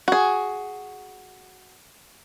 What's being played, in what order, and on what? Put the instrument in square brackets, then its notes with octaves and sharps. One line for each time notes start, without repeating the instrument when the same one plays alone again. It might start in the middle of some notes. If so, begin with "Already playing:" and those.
[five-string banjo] F#4 G#4